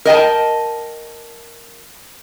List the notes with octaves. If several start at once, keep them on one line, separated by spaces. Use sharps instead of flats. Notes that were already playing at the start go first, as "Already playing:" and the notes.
A#4 D#5 G5 A5